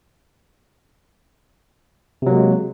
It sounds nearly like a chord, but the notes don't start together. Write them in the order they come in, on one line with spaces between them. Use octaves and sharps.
C3 F#3 A#3 G#3